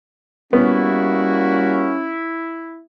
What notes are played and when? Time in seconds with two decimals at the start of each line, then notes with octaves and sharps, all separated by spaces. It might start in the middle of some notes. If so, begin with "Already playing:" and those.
0.53 G3 A#3 B3 C#4 E4 F#4